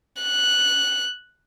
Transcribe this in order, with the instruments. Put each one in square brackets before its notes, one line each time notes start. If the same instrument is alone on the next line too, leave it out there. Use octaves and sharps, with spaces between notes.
[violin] F#6